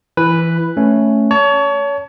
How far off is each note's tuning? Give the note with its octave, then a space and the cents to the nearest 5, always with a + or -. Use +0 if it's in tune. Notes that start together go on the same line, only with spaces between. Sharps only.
E3 +10 B4 +0
A3 +0 C#4 +0
C#5 +30 A5 +0